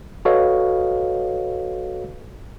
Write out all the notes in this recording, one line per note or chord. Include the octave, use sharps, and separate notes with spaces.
F#4 A4 B4 C#5 D#5 F5